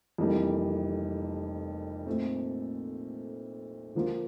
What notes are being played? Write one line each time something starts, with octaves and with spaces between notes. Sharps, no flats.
F1 F2 E3 G3 A#3
A#2 A3 C4
D3 F3 A#3 F4